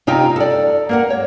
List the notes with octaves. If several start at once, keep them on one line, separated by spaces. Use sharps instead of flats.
C3 D#4 F4 G5
A4 D5
A#3 A#4 F#5
C#5